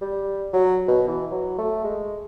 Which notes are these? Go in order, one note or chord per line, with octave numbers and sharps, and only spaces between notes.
G3
F#3
B2
E3
F#3
A3
G#3